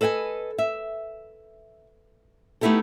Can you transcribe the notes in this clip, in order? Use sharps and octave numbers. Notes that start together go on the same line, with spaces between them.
A4 B4 D#5 G5 G#5
E5
A3 B3 D#4 E4 G4 A4